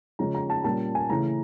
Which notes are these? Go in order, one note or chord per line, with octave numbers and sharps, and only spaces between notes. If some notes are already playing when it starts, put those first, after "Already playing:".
C#3 F3 G#3 C#4 A#5
A#5
A5
A#2 G3 A#3 C#4 A5
G#5
C#3 E3 A3 C#4 A#5